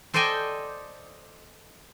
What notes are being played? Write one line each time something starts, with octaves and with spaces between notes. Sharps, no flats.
A4 C5 D5 D#5 G5 G#5